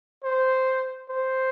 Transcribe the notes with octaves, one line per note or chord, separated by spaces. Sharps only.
C5
C5